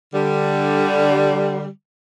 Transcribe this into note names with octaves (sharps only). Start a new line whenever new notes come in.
D3 G3